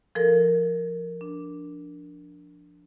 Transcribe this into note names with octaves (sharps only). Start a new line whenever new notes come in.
F3 A4 A#4
D4